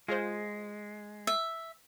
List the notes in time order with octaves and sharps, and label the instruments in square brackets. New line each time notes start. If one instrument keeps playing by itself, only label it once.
[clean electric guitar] G#3 [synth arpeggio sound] F4 G#4 C5
[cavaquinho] E5